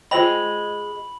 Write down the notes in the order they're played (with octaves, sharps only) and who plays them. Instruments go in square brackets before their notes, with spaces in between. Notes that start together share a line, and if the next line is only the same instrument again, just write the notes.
[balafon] F4 C5 G5 [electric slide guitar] G#4 D#5 [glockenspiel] B5 F#7